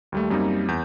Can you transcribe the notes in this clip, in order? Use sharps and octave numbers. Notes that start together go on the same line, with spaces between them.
D#2 G3 A3
F#2 G3 A#3 C4 D#4
E2 G6